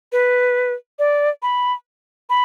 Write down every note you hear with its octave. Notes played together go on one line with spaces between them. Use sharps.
B4
D5
B5
B5